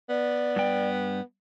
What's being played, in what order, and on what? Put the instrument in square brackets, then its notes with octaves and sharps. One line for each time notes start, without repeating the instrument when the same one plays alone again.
[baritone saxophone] B3 [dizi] D5
[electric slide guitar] G2 G5